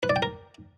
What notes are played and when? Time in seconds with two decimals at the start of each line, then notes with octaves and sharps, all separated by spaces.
0.03 B4
0.09 D5
0.16 G5
0.22 A#4